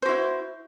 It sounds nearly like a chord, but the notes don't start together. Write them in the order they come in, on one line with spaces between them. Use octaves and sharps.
C5 F#4 E4